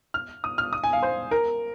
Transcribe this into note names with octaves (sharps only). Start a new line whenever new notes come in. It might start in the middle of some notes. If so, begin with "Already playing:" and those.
F6
D#6
F6
D#6
G#5
F5
C5
A#4